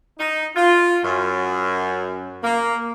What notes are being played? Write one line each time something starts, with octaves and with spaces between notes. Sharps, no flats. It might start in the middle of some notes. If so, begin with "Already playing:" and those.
D#4
F4
F#2
A#3